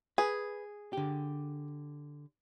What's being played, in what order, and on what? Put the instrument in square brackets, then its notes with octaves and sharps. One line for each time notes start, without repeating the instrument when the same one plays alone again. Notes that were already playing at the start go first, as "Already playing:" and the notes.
[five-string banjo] G#4 [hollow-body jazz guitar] B4
[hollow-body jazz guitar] D3 G4